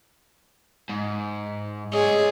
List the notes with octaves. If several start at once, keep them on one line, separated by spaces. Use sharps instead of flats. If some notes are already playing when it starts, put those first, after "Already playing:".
G#2
G#4 C#5 D#5